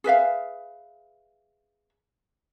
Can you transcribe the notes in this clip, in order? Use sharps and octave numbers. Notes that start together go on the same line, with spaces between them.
G#4 B4 E5 F5